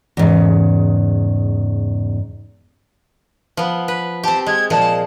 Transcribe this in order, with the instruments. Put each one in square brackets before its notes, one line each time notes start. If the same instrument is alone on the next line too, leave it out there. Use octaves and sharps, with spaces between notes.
[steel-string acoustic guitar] E2 G#2 C#3
[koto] F3 B3
B4
[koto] C4 G4 [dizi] A5
[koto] G#3 [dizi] G#6
[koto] A#2 F3 G#3 [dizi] A5